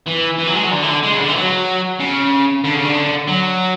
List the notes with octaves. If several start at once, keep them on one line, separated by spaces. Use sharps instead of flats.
E3
E3
F#3
G#3
F#3
D3
E3
D3
G#3
C#3
D3
E3
F#3
C#3
D3
C#3
D3
F#3